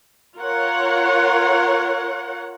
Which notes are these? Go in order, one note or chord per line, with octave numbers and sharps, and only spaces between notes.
F4 A#4 C#5 F#5